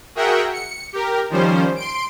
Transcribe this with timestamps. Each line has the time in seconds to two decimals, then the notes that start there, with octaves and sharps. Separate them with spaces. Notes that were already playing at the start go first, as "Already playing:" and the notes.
0.15 F#4 G#4 A#4 E5 F#5 G5
0.53 C#7
0.93 G4 A#4
1.30 D#3 F3 G3 C#4 C5
1.76 C6 D7